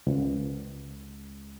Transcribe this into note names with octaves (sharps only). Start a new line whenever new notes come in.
C#2